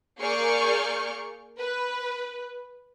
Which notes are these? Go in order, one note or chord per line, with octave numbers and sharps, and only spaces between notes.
A#3 G#4 D5 C#6 F6 G6
B4